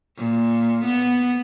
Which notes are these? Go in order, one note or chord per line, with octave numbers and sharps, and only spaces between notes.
A#2
B3